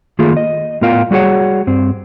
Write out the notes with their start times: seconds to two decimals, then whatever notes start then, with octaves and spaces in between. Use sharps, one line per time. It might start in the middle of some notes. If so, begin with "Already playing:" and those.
0.19 D#3 A3 A#3 F4 G#4
0.37 D#5
0.81 A2 B3 F4 A#4 F5 G5
1.11 G3 F#4 G#4 C#5 F#5
1.67 G2 C4